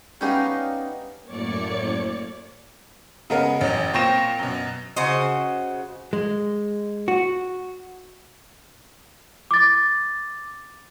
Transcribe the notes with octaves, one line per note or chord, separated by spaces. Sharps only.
G3 B3 C#4 D#4 G4 F5
F#2 A2 A#3 C#5 D5 C#7
C#3 G#3 B3 D#4 A#4
A1 F#2
A#2 C4 G5 C#6 A#6 E7
F#2 B2
C#3 F#4 C5 D#5
G#3
F#4
D6 A6